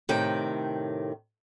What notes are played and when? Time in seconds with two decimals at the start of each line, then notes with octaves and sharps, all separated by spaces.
0.09 A2 C3 D#3 G5